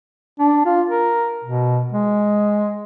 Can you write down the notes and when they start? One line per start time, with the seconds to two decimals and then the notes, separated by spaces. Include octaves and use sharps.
0.40 D4
0.66 F4
0.89 A#4
1.44 B2
1.92 G#3